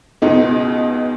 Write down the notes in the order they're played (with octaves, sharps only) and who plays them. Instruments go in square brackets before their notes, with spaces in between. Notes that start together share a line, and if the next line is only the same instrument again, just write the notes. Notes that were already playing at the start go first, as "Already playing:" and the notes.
[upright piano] C#2 B2 G#3 D#4